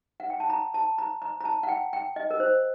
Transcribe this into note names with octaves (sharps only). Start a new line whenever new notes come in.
F#5
G5
A5
A#5
A5
A#5
A#5
A#5
A5
F#5
G5
G5
D#5
A#4
C5